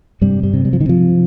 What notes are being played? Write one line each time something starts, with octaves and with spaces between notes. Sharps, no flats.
G2 C3 G3
G2 G3
C3
G3
F3
D#3
C3 F3